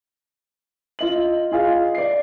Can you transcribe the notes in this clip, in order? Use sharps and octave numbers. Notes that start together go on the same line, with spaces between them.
F4 D#5 F#7
F4 G#4 D#5 F5
D5 C7